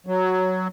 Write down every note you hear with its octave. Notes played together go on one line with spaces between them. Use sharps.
F#3